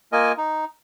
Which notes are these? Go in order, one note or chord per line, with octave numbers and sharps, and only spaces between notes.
A#3 F4 A#4 D#5 G#5
D#4